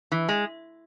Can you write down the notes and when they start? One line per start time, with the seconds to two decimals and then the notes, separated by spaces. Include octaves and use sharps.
0.12 E3
0.29 G#3